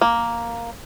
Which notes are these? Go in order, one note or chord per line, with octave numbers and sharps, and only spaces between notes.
A#3